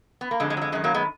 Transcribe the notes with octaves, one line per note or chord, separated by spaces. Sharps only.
B3
A#3
F2 D3 F3 G#3
G#3
F#3
G#3
F#2 D#3 G#3
F#3 A#3
G#3 B3